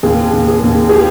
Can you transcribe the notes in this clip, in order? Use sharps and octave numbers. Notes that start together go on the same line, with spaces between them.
D#2 G#4
D#2
G#4
D#2
G#4
G4